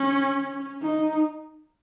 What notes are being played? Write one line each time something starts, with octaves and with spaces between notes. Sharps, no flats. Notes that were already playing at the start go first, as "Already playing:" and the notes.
Already playing: C#4
D#4